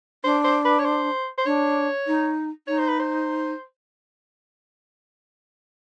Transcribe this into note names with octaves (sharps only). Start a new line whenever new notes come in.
D4 C5
C5
B4
C#5
C5
C5
D4 C#5
D#4
D#4 C#5
C5
B4
C5